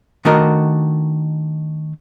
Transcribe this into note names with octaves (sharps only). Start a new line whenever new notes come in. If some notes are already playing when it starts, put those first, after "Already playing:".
D#3 A3 D4 F#4 A#4 D#5